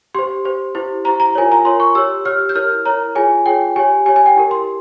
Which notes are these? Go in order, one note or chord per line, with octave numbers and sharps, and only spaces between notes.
G4 C5 C6
G4 C5
E4 G4 C5
E4 G4 C5 A#5
A#5
F4 A#4 C#5 G#5
A#5
F4 A#4 C#5 C6
C#6
G4 C#5 E6
G4 C#5 F6
G6
E4 A#4 C#5 F6
E4 A#4 C#5 A#5
F4 G#4 C#5 G#5
F4 G#4 C#5 G5
G4 C#5 G#5
G4 C#5 G#5
G#5
G5
E4 G4 A#4
C6